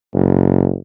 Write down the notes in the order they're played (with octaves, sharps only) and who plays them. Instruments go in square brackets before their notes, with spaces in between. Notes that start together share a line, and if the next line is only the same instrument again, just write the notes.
[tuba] F#1